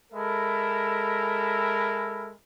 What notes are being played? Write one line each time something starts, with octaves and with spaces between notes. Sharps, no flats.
G#3 A4 A#4 E5 B5